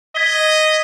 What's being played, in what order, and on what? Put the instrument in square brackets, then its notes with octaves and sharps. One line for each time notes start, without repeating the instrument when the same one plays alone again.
[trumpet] D#5 [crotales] G#6 B6 G7